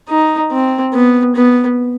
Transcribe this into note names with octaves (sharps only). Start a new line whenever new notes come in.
D#4
C4
B3
B3